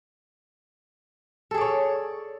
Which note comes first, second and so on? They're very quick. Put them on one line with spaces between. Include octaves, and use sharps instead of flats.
A4 G#4 D5 C#5